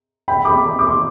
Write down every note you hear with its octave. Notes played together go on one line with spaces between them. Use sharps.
G5 B5
B5 D6
D6
C6